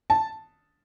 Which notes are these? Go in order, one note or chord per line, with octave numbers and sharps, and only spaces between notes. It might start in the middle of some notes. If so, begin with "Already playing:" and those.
A5